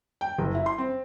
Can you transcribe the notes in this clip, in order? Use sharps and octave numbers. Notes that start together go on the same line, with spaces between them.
G5
F#1
E4
C6
C4